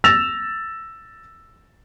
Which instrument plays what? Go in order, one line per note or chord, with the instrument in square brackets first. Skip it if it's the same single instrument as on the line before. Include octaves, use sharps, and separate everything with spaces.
[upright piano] E6 A6 A#6 E7 F7